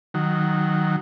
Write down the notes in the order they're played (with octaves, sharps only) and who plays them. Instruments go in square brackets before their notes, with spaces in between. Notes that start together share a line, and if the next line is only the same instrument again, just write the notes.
[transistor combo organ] D#3 F#3